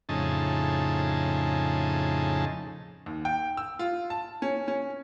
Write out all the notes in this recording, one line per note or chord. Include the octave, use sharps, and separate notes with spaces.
F2 A2 C#3 D#4 G#4 A5
D#2
G5
E6
F4
A5
C#4
C#4